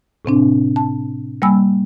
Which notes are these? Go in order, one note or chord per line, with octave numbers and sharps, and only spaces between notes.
A2 C3 C4 D4
A5
G3 A#3 G#5 B5 E6